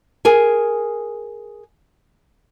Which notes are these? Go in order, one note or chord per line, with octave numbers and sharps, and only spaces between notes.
G#4 A#4 G#5